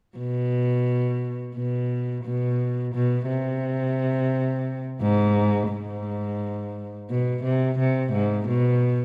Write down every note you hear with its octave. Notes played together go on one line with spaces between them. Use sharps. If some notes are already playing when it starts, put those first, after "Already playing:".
B2
B2
B2
B2
C3
G#2
G#2
B2
C3
C3
G#2
B2